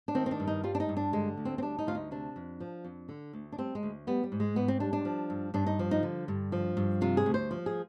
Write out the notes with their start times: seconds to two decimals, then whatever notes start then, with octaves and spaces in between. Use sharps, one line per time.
0.08 D4
0.15 D#3 C4
0.26 C4
0.31 D4
0.40 G2
0.47 D#4
0.63 G3 F4
0.75 D4
0.80 D#4
0.89 G2
0.97 D4
1.13 D3 G#3
1.37 D2
1.45 C4
1.58 C4
1.62 G3 D4
1.78 D#4
1.87 D2 F4
1.95 D#4
2.11 C3 D4
2.36 F2
2.60 F3
2.84 F2
3.09 D3
3.33 D2
3.52 D4
3.58 G3 C4
3.75 G#3
3.83 D2
4.07 G3 B3
4.24 G3
4.32 G#2
4.40 G#3
4.56 G#2 B3
4.68 C4
4.80 G3 D4
4.93 D4
5.05 F3
5.30 G2
5.54 G2 D4
5.67 D#4
5.79 F3
5.91 D#4
6.03 D3
6.28 G2
6.52 F3
6.77 G2
7.01 C3 F4
7.17 G#4
7.26 D2
7.34 C5
7.51 F3
7.66 G#4